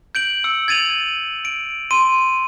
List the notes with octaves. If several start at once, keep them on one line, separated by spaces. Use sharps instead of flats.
G6 D7 F#7
E6 C#7
G#6 A6 D#7 F7 F#7
D7
C6 D#7